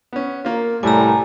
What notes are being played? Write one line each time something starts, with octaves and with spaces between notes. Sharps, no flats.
B3 C#4
A#3 F4 A#4
C2 A2 G3 G#5 A#5